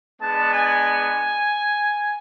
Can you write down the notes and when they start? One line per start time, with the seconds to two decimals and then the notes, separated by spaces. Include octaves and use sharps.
0.20 G#3 B3 D4 A5
0.53 G#5